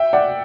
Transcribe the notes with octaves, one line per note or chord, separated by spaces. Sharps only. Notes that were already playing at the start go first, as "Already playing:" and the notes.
Already playing: E5 G5
D5 F#5